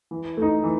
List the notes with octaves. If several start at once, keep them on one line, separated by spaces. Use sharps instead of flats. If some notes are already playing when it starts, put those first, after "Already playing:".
E3
A3 D#4
E3